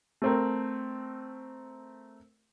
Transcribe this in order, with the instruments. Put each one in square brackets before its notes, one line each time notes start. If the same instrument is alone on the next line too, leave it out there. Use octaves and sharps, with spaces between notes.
[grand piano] A3 C4 A#4